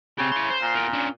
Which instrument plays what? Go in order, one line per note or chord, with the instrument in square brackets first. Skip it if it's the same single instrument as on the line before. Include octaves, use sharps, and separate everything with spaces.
[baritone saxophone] C#3 [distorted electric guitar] C4 G4
[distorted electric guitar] E3 C6
C5
[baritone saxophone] A#2
[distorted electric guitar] E2 A#4
C#4 D4